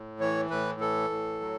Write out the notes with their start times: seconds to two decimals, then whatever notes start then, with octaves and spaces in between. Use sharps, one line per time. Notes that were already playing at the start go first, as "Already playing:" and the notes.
Already playing: A2
0.20 E3 C#5
0.50 A2 B4
0.80 E3 A4
1.10 A2
1.40 F#3